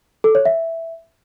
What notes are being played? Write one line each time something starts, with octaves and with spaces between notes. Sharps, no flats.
A4
C#5
E5